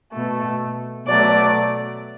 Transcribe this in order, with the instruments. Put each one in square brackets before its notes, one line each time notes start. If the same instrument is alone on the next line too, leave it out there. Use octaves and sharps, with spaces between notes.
[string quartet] B2 A3
B2 F#3 A3 D5